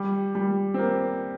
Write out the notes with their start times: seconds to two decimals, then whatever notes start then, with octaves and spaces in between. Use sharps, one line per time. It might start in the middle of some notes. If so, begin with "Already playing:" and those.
Already playing: G3
0.35 G3
0.74 C4
0.79 A#3